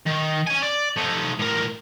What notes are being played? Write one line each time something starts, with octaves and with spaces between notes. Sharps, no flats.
D#3
C#4 G#5
D5
A3 D#4
A2 A#4